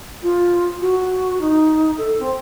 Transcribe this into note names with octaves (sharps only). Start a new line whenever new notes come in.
F4
F#4
D#4
A4
C4